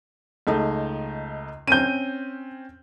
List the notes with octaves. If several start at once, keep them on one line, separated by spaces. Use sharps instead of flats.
C#2 A3 D#4
C4 C#4 G6 D#7